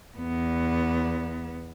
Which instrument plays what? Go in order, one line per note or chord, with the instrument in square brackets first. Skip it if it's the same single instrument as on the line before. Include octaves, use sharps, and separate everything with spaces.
[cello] E2 B3